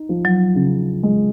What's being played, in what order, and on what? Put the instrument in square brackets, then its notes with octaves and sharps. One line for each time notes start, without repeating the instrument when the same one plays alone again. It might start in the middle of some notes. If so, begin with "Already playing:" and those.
Already playing: [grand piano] D#4
F3
[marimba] F#3
[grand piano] C#3
G#3